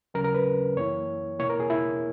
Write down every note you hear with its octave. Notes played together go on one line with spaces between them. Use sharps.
D#2 C#3 F#3 C#4 A#4
A#4
B4
F#2 E3 A#3 E4 C#5
E2 B2 A#3 E4 C#5
A#4
G#4
E4